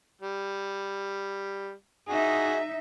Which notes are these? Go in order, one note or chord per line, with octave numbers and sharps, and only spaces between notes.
G3
D#4 F#4 G#4 E5